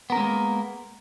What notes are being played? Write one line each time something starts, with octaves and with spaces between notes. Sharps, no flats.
G#3 A#3 B3 C#4 A#4